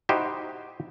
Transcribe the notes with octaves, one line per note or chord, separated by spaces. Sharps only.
D#4 E4 F#4 G4 C5 D#5